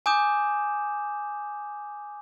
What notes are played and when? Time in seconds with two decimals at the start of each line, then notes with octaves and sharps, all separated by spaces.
0.06 G#5 D6 D#6 G6 E7